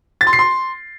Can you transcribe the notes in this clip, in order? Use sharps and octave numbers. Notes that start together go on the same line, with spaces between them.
A6
C6
C7
C6